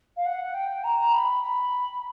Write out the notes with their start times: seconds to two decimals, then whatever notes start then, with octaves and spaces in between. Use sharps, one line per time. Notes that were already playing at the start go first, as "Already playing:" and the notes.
0.17 F5
0.26 F#5
0.54 G5
0.84 A#5
1.12 B5
1.42 B5